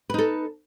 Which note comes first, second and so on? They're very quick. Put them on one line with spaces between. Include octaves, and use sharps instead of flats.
B4 D#4 A4